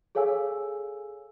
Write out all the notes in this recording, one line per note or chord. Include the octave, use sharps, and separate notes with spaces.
G#4 A4 C#5 F5 G#5 E6